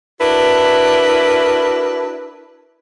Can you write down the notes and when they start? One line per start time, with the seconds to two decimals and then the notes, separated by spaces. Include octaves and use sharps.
0.20 D4 E4 F#4 A#4 B4